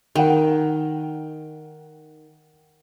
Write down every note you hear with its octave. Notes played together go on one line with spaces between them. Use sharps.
D#3 F#5 G5